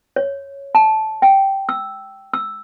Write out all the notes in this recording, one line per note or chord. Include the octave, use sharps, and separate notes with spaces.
C#5
A5
G5
E6
E6